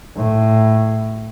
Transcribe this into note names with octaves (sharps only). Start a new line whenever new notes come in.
A2